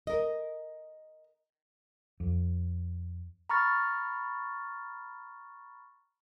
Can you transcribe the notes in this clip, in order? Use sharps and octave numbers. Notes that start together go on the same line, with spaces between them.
A#4 D#5
F2
A#5 B5 C#6 F6 A6